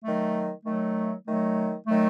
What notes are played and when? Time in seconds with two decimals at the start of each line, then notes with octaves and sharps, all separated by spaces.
0.04 D#3 F#3 A3
0.65 D#3 F#3 A3
1.26 D#3 F#3 A3
1.87 D#3 F#3 A3